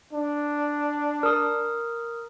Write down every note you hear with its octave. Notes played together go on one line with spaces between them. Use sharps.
D4
A#4 D#6